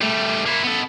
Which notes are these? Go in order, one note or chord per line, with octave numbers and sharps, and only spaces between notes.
G3 A3
A#3 E4
B3 A4